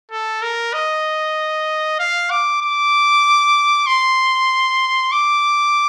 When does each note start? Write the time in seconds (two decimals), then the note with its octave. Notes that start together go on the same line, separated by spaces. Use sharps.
0.12 A4
0.42 A#4
0.74 D#5
1.99 F5
2.31 D6
2.61 D6
3.87 C6
5.12 D6